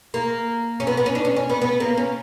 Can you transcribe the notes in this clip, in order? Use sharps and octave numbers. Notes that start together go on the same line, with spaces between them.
A#3
C#4
B3
B3
C#4
D4
C#4
C#4
B3
B3
A#3
C#4